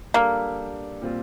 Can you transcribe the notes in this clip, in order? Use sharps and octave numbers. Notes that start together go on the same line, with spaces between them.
G3 A#3 D4 A4 D5
A#2 G3 C4 F4